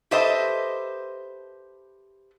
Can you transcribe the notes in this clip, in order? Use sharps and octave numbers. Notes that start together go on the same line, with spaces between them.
G4 A4 B4 C5 D#5 E5